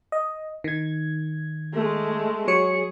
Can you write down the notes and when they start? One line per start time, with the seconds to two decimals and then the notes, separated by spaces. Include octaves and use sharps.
0.12 D#5
0.64 D#3 G#6
1.73 G#3 A3
2.48 F#3 G#4 C#5 C#7